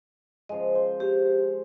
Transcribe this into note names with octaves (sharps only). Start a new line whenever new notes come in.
C#3 F3 G#3 D#5
C5
G4 C5 C#5